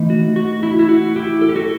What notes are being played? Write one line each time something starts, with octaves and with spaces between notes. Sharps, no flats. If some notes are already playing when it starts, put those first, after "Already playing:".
Already playing: E3 A3 D#4
F#4
F#4
E4
E4
F#4
E4 G4
A4
G4
F#4 A4